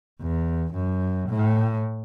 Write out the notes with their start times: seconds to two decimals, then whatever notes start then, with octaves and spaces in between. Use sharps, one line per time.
0.21 E2
0.74 F#2
1.29 A2